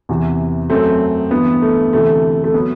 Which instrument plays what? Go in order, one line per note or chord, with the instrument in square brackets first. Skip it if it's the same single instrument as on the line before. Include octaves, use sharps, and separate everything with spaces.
[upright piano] E2 C3 E3
F#2 F#3 A3 C4
G2 E3 B3
A3
D2 C3 E3 A3
A3
B3
F#3